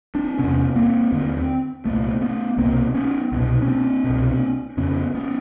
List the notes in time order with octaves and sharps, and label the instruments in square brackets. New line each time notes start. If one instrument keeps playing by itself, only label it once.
[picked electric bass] C4 D4
E2 C3 B3 C#4
A#3 C4
D#2 D3
C2 A#2 A3 B3
A3 B3
C2 B2 A#3 C4
B3 C#4
C2 B2
C#4
C4 D4
B2
C2
F2 C#3 B3 C#4
B3 C#4